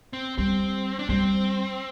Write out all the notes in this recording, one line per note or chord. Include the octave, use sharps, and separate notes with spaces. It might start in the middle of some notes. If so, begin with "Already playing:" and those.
C4
G3 C4
D4
G3 C4